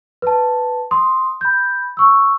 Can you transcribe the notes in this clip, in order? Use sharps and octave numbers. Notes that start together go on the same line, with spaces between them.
B4 A5
C6 D#6
B5 G6
C#6 E6